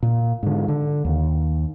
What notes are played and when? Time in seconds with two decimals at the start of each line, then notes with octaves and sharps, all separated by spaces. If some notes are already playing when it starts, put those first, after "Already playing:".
0.03 A#2
0.43 G#2 D3
0.68 D3
1.05 D#2